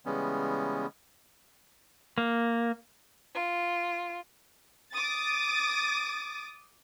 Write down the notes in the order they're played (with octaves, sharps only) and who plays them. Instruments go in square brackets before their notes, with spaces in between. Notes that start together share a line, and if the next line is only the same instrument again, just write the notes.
[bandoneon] C#3 E3 G3 G#3 B3 C#4
[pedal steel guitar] A#3
[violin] F4
[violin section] D6 D#6 A6